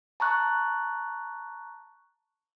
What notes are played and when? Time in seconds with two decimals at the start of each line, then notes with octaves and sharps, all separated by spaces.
0.20 A5 A#5 C#6 F#6